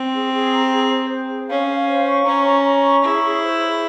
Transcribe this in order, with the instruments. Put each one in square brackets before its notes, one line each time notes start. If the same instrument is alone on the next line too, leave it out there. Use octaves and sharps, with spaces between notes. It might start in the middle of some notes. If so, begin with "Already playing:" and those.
Already playing: [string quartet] C4
[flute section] G#4
G#4
A#5
G#4
C5
C5
G#4
[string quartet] C#4 [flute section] F5
[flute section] F5
C5
C#6
[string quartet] C#4 [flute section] A#5
[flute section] A#5
A#5
C#6
[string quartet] E4 [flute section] G#4
[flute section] G#4
C5
G#4